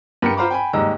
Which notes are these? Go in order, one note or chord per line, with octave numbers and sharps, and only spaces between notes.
G2 A#4 G5 C#7
F4 C5 F5 A#5 B5 D6
G5 G#5 B5
D#2 G#2 G3 D#5 A#5 E6